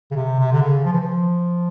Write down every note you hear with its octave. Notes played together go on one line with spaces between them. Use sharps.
C#3
C3
C3
D3
C#3
F3
E3
F3